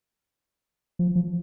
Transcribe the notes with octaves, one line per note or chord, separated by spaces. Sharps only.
F3
F3